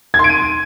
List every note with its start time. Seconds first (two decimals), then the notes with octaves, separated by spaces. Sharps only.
0.14 G#6
0.19 C6
0.24 D7
0.29 D#7